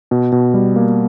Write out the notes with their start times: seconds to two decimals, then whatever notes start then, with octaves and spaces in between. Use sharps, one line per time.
0.11 B2
0.32 B2
0.54 G3
0.76 A#3